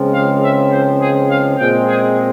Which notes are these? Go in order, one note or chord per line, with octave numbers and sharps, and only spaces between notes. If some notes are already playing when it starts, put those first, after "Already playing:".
Already playing: C#2 C#3 F3 G#3 C4
F5
E5
C5
G#4
F5
A#2 G#3 C4 G5
G#4